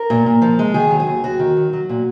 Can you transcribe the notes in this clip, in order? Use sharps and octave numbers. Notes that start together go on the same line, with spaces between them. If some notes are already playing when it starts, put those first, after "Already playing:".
Already playing: A#4
A#2
A#2
F3
G#3
D#3 G#4
F#3
G#4
D#2
D#2 F#4
D#3
F#3
F#3
A#2